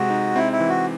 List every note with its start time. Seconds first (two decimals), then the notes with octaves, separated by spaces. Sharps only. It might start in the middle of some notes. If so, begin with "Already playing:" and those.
Already playing: C3 G#3 F#4
0.10 D#4
0.35 C4 E4
0.52 E4
0.60 E3
0.68 F#4